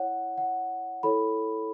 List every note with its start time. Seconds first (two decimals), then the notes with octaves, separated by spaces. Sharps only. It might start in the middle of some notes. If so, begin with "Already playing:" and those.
Already playing: E4 C#5 F#5
0.38 F#5
1.03 E4 A4 C#5 B5